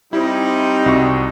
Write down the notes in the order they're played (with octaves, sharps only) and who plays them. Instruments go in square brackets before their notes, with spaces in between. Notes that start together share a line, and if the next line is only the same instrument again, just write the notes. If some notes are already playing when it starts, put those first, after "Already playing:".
[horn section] G3 C4 D#4 [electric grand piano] E4
[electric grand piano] C2 F#4 C#6